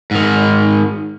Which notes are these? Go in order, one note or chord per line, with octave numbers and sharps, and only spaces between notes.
G#2 D#3